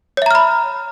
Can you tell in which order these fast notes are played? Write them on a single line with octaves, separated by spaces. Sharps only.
C#5 E5 A#5 F6 B5